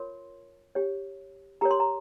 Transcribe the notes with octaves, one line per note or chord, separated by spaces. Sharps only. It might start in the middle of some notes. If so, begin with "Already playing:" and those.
Already playing: F4 A#4 C#5 C6
G4 C#5
G4 A#4 C#5 A#5
C6
A#5